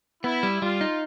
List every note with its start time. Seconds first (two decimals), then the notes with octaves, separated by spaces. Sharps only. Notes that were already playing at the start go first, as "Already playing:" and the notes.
0.24 B3 E4
0.43 G3
0.61 G3 F4
0.81 D#4